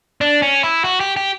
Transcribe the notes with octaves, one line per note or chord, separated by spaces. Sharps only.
D4
C#4
E4
F#4
G4
G4